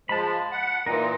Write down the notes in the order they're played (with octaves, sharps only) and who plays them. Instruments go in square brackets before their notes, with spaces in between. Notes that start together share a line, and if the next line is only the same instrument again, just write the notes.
[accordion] F3 G#3 [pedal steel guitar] A5 B5
[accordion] F#5
[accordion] A#2 E3 [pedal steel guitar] D#4 A#4